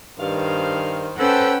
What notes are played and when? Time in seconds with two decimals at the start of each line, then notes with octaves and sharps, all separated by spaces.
0.20 G2 D#3 C5 F5
1.18 C#4 A4 B4 C5 F#5 G5 E6